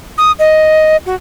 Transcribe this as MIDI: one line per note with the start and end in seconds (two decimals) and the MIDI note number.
0.18 0.32 87
0.39 0.97 75
1.06 1.15 66